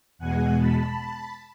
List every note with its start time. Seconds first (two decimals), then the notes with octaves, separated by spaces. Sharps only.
0.19 E2 B2 G#3 F#5 G#5
0.58 A5 B5